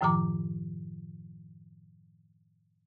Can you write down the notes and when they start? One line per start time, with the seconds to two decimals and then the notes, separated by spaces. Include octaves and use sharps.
0.01 F#2 A2 D#3 F3 A#5 D6